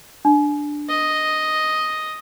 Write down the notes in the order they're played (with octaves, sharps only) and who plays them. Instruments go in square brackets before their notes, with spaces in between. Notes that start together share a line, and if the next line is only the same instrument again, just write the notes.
[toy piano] D4
[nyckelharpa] D#5